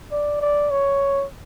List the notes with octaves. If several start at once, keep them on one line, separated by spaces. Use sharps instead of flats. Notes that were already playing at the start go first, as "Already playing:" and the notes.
D5
D5
C#5